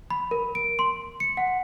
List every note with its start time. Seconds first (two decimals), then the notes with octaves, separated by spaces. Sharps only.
0.10 B5
0.31 A#4
0.55 D7
0.79 C6
1.20 C#7
1.37 F#5